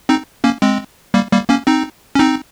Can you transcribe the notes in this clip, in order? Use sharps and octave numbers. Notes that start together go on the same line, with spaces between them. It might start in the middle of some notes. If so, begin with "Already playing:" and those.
C4 D#4
A#3 C#4
G#3 C4
G3 A#3
G3 A#3
A#3 C#4
C4 D#4
C#4
C4 D#4